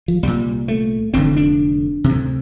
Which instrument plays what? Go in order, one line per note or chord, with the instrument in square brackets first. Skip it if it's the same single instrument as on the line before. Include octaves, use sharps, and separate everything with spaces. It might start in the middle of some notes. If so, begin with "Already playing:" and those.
[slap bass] F3
C2 A#2 G3
A3
F1 F2 D3 C4
D4
D2 C3